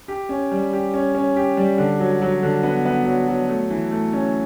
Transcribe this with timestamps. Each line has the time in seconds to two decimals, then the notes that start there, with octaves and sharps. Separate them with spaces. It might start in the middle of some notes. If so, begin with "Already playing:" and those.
0.08 G4
0.29 C#4
0.52 G3
0.73 G4
0.94 C#4
1.15 C#4
1.36 G4
1.57 G3
1.78 D3
1.99 F#3
2.22 F#3
2.43 D3
2.63 B3
2.85 B3
3.06 F#3
3.28 F#3
3.49 A3
3.70 E3
3.91 A3
4.13 C#4